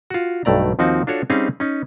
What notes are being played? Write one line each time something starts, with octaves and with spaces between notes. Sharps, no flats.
F4 F#4
B1 G2 A3 D5 A#5
D#2 F3 C4 D#4 F#4
D4 F4 F#4 A4 C#5
G3 C4 C#4 D#4 G#4 F5
C#4 D#4